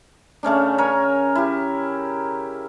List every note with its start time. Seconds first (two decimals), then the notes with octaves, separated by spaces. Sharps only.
0.43 C#3 A3 C#4 D4
0.78 A#4 C#5 G#5
1.35 E4 G4